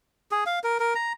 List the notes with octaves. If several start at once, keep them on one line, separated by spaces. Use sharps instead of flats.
G#4
F5
A#4
A#4
A#5